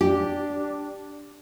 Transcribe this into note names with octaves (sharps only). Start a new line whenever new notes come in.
D4 G4